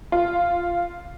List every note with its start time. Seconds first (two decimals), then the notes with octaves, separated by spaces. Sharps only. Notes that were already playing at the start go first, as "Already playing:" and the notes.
0.12 F4